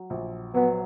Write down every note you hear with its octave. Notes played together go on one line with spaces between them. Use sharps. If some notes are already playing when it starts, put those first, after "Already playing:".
Already playing: F#3
A#1
F#3 B3